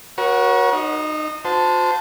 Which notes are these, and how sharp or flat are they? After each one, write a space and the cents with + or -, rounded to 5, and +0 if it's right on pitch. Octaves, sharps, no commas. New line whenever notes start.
F#4 +0 A#4 +40 C#5 -5
D#4 -25 D#5 +30
F#4 -45 C5 -20 A5 +0